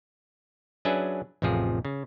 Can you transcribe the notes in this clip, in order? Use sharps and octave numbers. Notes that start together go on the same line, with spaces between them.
F#3 C#4 D4 G#4 B4 E5
A1 F2 C3 F3 G#4
C#3